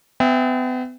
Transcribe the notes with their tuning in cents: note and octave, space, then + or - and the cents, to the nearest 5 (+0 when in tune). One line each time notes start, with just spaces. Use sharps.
B3 +40 E5 +0 G5 +35